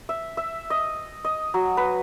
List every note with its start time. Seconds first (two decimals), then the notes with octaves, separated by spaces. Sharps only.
0.09 E5
0.37 E5
0.70 D#5
1.25 D#5
1.54 F#3
1.77 B4